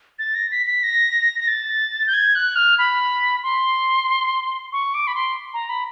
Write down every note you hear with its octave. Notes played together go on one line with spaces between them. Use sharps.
A6
A#6
B6
B6
A#6
A#6
A6
G6
G#6
F#6
F6
B5
C6
C#6
D6
B5
C6
A#5
B5